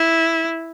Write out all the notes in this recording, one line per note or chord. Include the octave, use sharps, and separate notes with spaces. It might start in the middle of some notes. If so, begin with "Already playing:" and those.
Already playing: E4